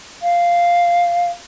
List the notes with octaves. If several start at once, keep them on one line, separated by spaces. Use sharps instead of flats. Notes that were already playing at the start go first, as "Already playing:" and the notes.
F5